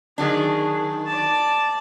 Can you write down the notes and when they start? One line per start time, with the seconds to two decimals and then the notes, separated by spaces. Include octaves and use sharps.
0.18 D#3 F#3 D4 G#4
1.07 D5 A5